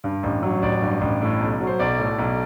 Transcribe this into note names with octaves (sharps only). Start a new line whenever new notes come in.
G2
A1
F#3
A1 D5
G2
A1
A2
B1
F#3
C5
B1 D5
A2
B1